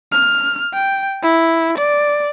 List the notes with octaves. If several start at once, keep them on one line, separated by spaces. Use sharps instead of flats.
F6
G5
E4
D5